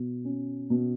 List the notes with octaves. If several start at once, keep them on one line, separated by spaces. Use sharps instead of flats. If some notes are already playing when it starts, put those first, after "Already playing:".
Already playing: B2
C#4
B2